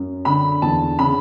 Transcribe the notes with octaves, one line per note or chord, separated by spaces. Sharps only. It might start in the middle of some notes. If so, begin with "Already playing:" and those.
Already playing: F#2
D3 B5
E2 A5
C#3 B5